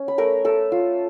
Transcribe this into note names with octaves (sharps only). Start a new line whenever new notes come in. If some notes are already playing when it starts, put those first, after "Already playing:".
Already playing: C#4
B5
A3 A#4 A#5
A3 A4 A5
F4